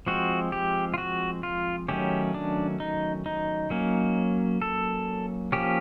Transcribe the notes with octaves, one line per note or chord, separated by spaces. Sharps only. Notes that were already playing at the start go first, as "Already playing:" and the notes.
F3 G#3 C4 F#4
G4
F4
F#4
F4
D#3 F#3 A3 C#4 G4
D4
D#4
D#4
F#3 A#3 C#4
A4
F3 A#3 C#4 G4